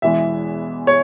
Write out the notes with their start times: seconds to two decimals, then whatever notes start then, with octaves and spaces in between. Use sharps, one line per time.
0.02 E1 E2 E3 G#3 E5
0.87 C#5